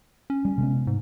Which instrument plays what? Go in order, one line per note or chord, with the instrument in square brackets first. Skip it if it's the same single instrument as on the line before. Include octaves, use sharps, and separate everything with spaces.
[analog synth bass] C#4
[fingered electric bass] G3
C3 G#3 B3
[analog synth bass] G#2